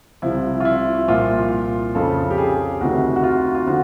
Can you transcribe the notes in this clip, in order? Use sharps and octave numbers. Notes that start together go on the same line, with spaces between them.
C2 C3 F3 E4
F4
E4
C2 A#2 F3 F4
F2 C#3 F3 A4
G4
G#4
D2 C3 D#3 F#4
F#4
F4
F4
D3 F3 F#4